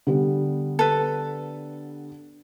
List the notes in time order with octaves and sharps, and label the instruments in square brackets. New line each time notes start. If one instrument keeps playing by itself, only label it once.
[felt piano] D3 G3 B3
[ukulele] A4 B4